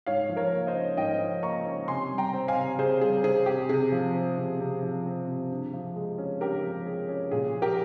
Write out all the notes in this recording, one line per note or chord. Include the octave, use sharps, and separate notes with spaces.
G#2 C#5 F5
F3
A#4 C#5
A#3
C5 D#5
C#4
G#2 D#5 G5
F3
A#3 A#5 C#6
C#4
C3 G#5 C6
G3
G5 A#5
C4
F5 G#5
C3
C3 G#4 C5
G3 G#4
C4 G#4
C3 G4
C3 G#4
F3
C4
C3
C3
F3
C4
C3
G2
F3
G#3
C#4
G2 G4 A#4
F3
G#3 G#4
C#4
A#2 G#4
F3
G4 A#4